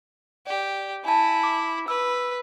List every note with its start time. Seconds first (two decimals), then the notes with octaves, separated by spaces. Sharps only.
0.47 G4 D5
1.05 E4 G#5 A5
1.43 D6
1.88 B4 E6